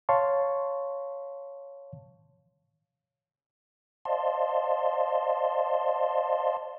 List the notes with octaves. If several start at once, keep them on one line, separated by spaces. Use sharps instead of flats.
C#5 F5 A5 C6 C#6
C5 D5 D#5 F5 A5 C6